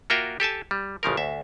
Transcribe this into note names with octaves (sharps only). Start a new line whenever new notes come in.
A#3 F4 F#4 A#4 E5 G5
G4 A4 G#5 A5
G3
A1 C#3 F3 A#4
D2 E5